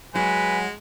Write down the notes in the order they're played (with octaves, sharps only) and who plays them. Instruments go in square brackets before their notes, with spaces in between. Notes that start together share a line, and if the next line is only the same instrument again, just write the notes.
[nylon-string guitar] F#3 F#4 [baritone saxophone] G#3 [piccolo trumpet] B4 [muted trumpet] G#5